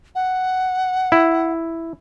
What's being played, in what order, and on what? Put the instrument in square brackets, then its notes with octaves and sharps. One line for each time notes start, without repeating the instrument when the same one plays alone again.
[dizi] F#5
[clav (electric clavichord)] E4